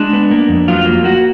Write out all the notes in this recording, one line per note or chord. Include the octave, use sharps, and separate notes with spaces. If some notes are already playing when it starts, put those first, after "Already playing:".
Already playing: G#3 D4
B3
A#3
F2
F#3 F4
A#3
A#3 F#4